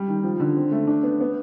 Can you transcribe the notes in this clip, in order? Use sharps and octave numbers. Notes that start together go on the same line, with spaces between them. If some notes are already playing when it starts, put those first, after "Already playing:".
Already playing: G3
D#3
F3
D3
C4
A3
D4
B3
B3